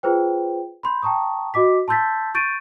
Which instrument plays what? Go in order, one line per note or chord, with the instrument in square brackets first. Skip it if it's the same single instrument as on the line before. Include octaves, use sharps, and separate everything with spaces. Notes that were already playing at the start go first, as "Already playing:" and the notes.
[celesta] F4 G#4 B4 C5 G5
B5 C6 G6
G5 A5 A#5 C#6 D#6
F#4 D#5 D6 B6
A5 C6 E6 G6 A6 B6
C#6 G6 A6 D7 D#7